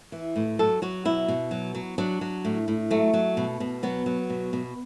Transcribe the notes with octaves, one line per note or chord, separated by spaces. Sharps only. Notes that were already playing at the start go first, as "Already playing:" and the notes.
E3
A2
F#3 A4
F#3 F#4
B2 E4
B2
F#3
F#3
F#3 D4
F#3
A2
A2
F#3 A3
F#3
B2
B2
F#3 B3
F#3
B2
B2